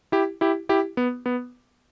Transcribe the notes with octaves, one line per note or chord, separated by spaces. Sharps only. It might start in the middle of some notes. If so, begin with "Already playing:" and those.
E4 G4
E4 G4
E4 G4
B3
B3